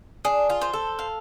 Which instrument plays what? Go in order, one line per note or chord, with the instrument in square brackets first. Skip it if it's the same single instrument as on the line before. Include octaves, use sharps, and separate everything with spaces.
[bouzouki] D4 [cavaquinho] G#4
[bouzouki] F4
[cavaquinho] C5
[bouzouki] A4
[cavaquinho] F5